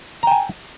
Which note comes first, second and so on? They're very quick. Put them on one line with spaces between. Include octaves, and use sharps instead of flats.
A#5 G5 G#5